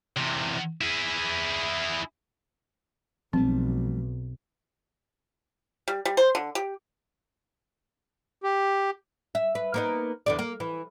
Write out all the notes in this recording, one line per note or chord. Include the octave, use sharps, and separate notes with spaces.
E2 C3
E4 G#4
B1 F3 G3 A3 C4
G3
G3
C5
D3
G4
G4
E5
B4
A#3 B3 D#4
E2 D3 D5
A#3
E3